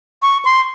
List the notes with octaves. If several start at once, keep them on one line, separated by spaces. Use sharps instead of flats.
C#6
C6